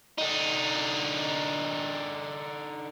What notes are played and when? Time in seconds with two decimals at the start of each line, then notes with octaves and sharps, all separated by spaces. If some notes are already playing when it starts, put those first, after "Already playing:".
0.18 D3 D#4